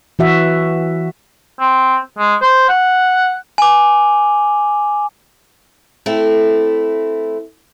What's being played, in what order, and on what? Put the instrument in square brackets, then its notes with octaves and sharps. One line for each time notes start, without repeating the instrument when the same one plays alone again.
[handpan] E3 F#4 E5
[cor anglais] C4
G#3
C5
F#5
[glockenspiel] G#5 D6
[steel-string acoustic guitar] A3 C4 E4